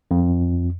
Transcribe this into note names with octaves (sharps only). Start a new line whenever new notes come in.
F2